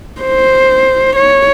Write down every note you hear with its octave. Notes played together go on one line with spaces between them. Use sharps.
C5
C#5